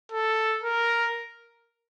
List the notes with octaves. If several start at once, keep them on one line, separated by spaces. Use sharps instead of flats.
A4
A#4